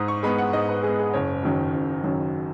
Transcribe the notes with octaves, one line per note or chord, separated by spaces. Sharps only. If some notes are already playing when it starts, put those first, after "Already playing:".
Already playing: G#2 D#6
C#6
G#3 B3 B5
F#5
G#2 D#5
B4
G#3 B3 G#4
G#4
F#1 C#5
F#2 D#3 F#3
F#1
F#2 D#3 F#3